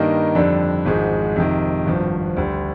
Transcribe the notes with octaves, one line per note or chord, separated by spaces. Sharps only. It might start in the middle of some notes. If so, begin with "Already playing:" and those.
Already playing: G2 D#3 G3 A#3 D#4
F2 D3 G3 D4
G#1 G#2 F3 G#3
F2 C3 D#3
G#1 G2 F3
D2 D3 G3